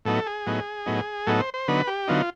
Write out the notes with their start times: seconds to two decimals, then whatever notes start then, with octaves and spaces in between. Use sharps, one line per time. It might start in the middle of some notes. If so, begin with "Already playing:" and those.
0.05 A2 F#3 B3 D#4 A4
0.26 G#4
0.46 A2 F#3 B3 D#4
0.86 A2 F#3 B3 D#4
1.27 A2 F#3 B3 D#4 A4
1.40 C5
1.54 C5
1.68 D3 F#3 B3 D#4 B4
1.87 G4
2.08 D3 F#3 B3 D#4 F4